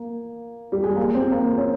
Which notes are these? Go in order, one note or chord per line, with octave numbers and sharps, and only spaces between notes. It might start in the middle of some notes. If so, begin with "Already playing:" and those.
Already playing: A#3
G3
G#3
A#3
C4
A#3
C#4